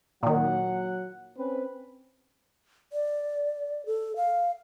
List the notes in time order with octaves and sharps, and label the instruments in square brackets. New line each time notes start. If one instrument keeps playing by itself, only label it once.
[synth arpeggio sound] A#2 D#3 [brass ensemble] F#3 F#5
[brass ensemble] C4 C#4 B4
[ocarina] D5
A4
F5